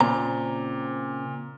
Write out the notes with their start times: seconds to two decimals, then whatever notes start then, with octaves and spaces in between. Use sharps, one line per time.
0.01 A#2 C#3 C4 A#5